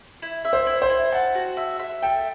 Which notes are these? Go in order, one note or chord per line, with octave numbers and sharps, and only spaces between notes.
E4
E5
C5
E4
C5
E4
F#5 A5
F#4
E5
E5
A4 G5